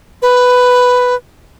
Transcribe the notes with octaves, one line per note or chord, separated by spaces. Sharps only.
B4